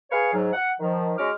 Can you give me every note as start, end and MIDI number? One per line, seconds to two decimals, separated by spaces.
0.11 0.31 68
0.11 0.31 71
0.11 0.31 73
0.11 0.31 77
0.34 0.52 44
0.34 0.52 54
0.53 0.70 78
0.80 1.13 51
0.80 1.13 53
1.19 1.32 56
1.19 1.32 61
1.19 1.32 66
1.19 1.32 86
1.19 1.32 89